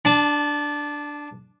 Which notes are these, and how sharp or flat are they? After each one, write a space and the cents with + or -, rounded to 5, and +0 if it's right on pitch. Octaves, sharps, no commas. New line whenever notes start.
D4 +0 A5 -25